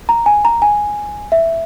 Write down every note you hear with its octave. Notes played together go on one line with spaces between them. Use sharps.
A#5
G#5
A#5
G#5
E5